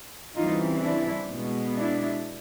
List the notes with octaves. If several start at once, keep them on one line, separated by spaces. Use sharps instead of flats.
C#3 E3 G3 C4 D#4 F4
D4 E4
B2 G#3 B3
D4 E4